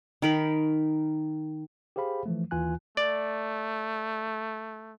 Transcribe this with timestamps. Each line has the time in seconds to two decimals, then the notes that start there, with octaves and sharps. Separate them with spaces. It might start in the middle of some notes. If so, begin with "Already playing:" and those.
0.22 D#3 A#4 B5
1.96 G4 G#4 C5 F5 B5
2.26 E3 F3 A3
2.51 D#2 E3 F4 G#5 F#6
2.97 A3 D5